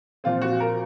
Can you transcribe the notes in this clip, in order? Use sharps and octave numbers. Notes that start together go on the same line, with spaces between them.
A#2 F3 C4 F4
F#4
A#4